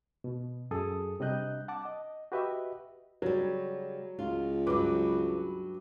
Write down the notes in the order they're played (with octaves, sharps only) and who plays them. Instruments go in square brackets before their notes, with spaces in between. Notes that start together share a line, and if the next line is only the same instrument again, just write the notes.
[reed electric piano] B2
F#2 G#4 A4 D#6
C3 G3 D4 D#5 F#6 G6
F#5 A5 D6
D#5
F#4 G4 B4 D#5 E5
[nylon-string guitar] C#3 G3 [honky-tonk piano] F#3
[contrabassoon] C#2 [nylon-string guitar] F4
[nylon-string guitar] G2 F#3 [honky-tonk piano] B4 D6